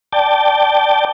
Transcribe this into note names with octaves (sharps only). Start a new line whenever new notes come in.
D5 G5 A5